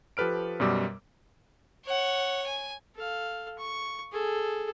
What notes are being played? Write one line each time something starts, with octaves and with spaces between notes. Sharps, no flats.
F3 G4 A4 B4 F6 D7
F#2 B2 G3 D6 E6
C#5 F#5
G#5
A4 F5
C#6
G#4 A4